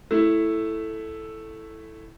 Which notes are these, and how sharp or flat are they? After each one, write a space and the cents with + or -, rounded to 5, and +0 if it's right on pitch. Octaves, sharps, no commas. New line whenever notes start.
A3 +0 E4 +0